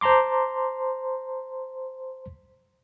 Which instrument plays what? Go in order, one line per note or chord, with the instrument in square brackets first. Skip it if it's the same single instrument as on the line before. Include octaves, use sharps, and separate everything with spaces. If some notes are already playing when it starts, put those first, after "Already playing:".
[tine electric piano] C5 A5 A#5 C6 D6